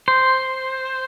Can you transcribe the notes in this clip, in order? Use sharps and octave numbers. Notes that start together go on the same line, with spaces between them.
C5